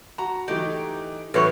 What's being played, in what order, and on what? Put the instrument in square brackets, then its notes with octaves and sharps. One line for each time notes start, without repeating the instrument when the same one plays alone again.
[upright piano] F#4 [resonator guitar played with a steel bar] A#5
[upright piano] E3 A3 D#4 [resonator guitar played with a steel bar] G4
[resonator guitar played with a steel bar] E2 F#3 C#5 [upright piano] A2 E3 [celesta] A4 B4 C#6